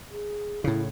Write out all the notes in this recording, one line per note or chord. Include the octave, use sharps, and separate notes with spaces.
G#4
A2 C#3 E4